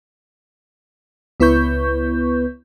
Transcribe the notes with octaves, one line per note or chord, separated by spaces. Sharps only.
C#2 B3 E4 B4 C#6 G6